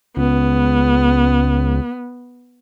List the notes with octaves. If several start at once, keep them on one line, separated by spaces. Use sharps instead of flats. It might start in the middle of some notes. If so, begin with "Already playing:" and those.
C#2 B3